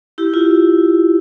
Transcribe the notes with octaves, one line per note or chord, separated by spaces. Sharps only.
E4 G4
F4